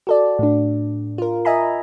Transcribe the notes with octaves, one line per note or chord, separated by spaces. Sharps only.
F#4 A4 D5
A2 D4
F4 A#4
D#5 E5 G#5 A#5 B5